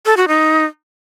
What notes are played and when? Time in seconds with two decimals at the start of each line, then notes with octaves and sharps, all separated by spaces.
0.06 A4
0.17 F#4
0.28 D#4